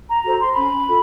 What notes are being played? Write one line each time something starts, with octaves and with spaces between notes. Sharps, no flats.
A#5
F#4 A4 C5 A#5
C6
C#4 B5
F4 A4